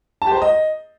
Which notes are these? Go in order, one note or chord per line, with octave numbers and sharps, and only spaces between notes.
A5
G4
C5
A#5
D#5